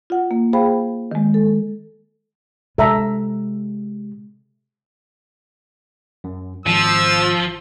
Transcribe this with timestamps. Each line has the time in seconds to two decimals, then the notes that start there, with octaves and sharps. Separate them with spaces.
0.10 F4 F#5
0.31 A#3
0.53 G#4 C5 F5 G5 B5
1.11 D#3 G#3
1.34 A4
2.78 C3 G#3 A4 E5 A#5
6.24 F#2
6.66 G#1 F3 E6